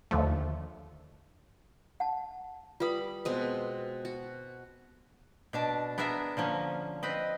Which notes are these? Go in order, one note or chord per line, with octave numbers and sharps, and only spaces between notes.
D#2 D3 F3 A3
F#5 A5
G3 F4 B4 B5 D#6
B2 G#3 C4
F#4
B2 D4 A5
B3 D4 G#4 A#4 E5
D3 F3 A#3 C#4
C4 B4 D#5